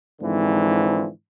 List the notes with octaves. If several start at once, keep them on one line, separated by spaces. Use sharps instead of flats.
G#2 D3 E3 F3 C4